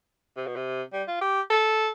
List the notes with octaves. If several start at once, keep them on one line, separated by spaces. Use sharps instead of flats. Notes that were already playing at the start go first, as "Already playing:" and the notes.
C3
B2
C3
G3
F4
G4
A4